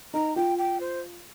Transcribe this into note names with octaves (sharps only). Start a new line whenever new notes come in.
D#4 A#5
F4 G5
G5
C5